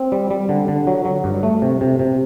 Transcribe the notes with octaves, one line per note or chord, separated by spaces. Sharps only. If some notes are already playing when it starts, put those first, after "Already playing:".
Already playing: C4
G3
G3
D3
D3
F#3
F#3
G2
A3
C3
C3
C3